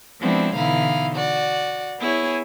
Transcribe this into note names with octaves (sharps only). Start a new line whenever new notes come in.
F3 G#3 B3 C4 D4 E4
B2 D3 E3 D#4 E4 F5
F#4 D5
B3 E4 G#4 C#5